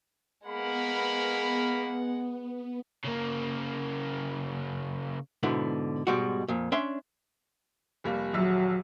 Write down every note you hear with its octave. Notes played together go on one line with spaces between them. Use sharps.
G#3 A#3 B3 A#4 F#5 B5
C#3 A#3
G#2 B2 D3 B3 E4
G#2 B2 G3 G#3 F#4
F2 A#2
C#4 D4 E5 C6
F1 G3 A#3
D#1 A#1 F#3 E5